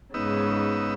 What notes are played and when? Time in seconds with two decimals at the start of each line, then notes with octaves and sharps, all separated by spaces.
0.14 G#2 C#3 B3 D#4 E6